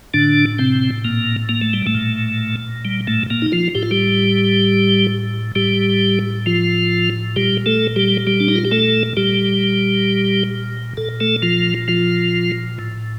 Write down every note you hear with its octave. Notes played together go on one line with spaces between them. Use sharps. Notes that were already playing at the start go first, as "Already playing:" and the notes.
A2 D3 D4
C3 C4
A#2 A#3
A#3
A3
G3
A2 A3
A#2
G3
A2 A3
A#2 A#3
D#4
F3 F4
A2 G4
F4
G3 G4
A2 G3 G4
F3 F4
A#2 G3 G4
A3 A4
G3 G4
G3 G4
D4
D#4
F4
G4
A3 A4
A#2 G3 G4
A#2 A4
A3 A4
F3 F4
F3 F4
A2